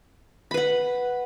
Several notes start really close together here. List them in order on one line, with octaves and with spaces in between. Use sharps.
B5 B4 F#5